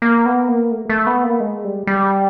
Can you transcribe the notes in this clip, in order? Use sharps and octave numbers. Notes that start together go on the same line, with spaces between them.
A#3
B3
A#3
A3
A3
B3
A#3
G#3
G3
G3